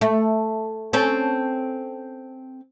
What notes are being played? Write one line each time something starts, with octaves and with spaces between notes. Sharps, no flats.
A3
C4 C#4 A4